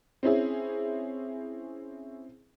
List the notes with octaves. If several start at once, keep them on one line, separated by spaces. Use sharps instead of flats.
C4 C#4 E4 G#4